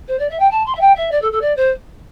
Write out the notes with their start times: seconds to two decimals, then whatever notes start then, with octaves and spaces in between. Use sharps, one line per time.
0.08 C5
0.19 D5
0.29 E5
0.39 G5
0.51 A5
0.66 C6
0.75 E5
0.80 G5
0.95 E5
1.11 D5
1.22 A4
1.32 A4
1.41 D5
1.56 C5